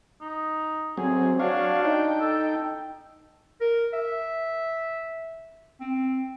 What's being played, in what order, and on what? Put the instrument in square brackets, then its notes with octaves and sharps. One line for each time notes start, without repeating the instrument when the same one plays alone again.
[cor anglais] D#4
[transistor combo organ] F#3 C4 [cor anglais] G#4
[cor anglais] D4 [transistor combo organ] F#4 C#5 F5
[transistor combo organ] D#4 G5
[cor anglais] A4
[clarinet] A#4
E5
C4